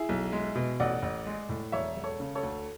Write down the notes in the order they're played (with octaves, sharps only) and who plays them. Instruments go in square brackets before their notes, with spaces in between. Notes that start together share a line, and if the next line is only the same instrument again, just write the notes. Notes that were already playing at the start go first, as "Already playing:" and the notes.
Already playing: [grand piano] E4 G#4
B1
G#3
B2
A1 D5 F#5
A1
G#3
A2
E1 C#5 E5
E1
A4 C#5
C#3
A4 C#5
D2